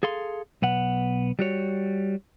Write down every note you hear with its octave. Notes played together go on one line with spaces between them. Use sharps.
G#4 A4 F5 C6
B1 B3 F#5
G3 F#4 C#5